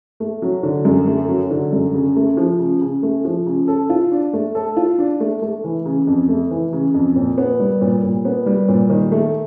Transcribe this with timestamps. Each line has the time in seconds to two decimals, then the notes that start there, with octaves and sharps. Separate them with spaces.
0.20 A3
0.42 F#3
0.63 D3
0.85 F#2
1.07 A3
1.28 F#3
1.51 D3
1.73 F#2
1.94 C#3
2.16 A3
2.37 F3
2.59 C#3
2.81 C#3
3.03 A3
3.25 F3
3.46 C#3
3.68 A4
3.90 F4
4.12 D4
4.33 A3
4.55 A4
4.77 F4
4.98 D4
5.20 A3
5.42 A3
5.64 E3
5.86 C#3
6.07 F2
6.29 A3
6.51 E3
6.73 C#3
6.94 F2
7.16 A#2
7.38 B3
7.59 G3
7.81 A#2
8.03 A#2
8.25 B3
8.46 G3
8.68 A#2
8.90 D#3
9.12 A3